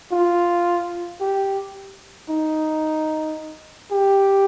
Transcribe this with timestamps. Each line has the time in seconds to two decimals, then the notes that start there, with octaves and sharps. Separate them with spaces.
0.12 F4
1.21 G4
2.29 D#4
3.91 G4